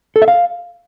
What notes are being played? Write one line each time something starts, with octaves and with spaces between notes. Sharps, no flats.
A4
E5
F5